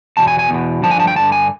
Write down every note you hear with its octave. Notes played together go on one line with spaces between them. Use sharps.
E2 B2 A5
G#5
G#5
E2 B2
G2 D3 F3 A5
G#5
A5
G5
G2 D3 F3 A5
G#5